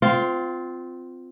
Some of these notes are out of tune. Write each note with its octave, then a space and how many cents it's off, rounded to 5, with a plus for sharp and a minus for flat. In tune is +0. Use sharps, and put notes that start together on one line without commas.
C4 -20 F4 +5